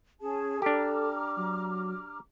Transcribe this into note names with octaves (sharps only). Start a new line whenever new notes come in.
C#4 G#4 A5
D4 G4 A4 A#5 D6 F6
F#3